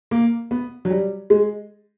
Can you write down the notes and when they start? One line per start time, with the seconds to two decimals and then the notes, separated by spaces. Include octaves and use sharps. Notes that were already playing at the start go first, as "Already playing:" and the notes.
0.11 A#3
0.51 B3
0.85 F#3
0.90 G3
1.30 G#3